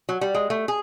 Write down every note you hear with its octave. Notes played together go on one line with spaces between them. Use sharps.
F#3
G3
G#3
A3
G#4